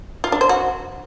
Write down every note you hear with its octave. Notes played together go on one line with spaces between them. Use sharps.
F4
D4
C5
F#4